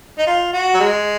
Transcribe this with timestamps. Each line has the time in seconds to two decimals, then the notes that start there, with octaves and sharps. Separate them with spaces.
0.19 D#4
0.27 F4
0.53 F#4
0.74 F#3
0.80 G#3